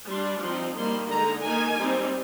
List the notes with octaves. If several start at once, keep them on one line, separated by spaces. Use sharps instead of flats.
G3 D4 C6
F3 C4 D#4 C6
D#3 G3 A#3 D#4 C6
D3 G#3 D#4 A#5
D#3 A#3 D#4 G#5
G3 C4 D#4